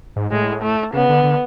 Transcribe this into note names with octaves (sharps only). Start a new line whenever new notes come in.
G#2
A2 G#3
A3
C#3 B3
D3
D3